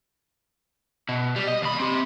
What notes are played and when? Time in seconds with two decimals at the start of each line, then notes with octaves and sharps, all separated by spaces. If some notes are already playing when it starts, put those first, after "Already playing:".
1.09 B2
1.36 G3
1.48 D#5
1.62 D#2 B5
1.80 C4 G4